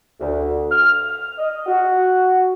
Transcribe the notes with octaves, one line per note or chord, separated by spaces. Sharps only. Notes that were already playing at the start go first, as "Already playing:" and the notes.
D2
F6
D#5
F#4